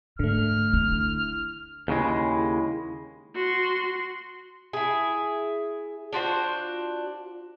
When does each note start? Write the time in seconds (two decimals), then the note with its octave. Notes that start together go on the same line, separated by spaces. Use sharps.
0.19 G#2 D3 A3 F6
0.73 D4 E4
1.88 D#2 C#3 G#3 E4
3.35 F#4 C6
4.73 E4 G#4
6.13 D4 F4 F#4 C5